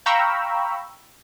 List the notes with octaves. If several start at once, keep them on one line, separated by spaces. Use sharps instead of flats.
F5 G5 A#5 B5 C#6 E6